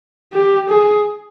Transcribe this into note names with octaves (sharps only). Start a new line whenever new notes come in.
G4
G#4